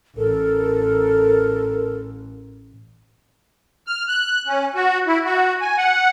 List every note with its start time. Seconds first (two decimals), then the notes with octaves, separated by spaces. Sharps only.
0.16 A1 A4 A#4
3.87 F6
4.08 F#6
4.47 C#4
4.75 F#4
5.07 E4
5.25 F#4
5.61 G#5
5.77 F#5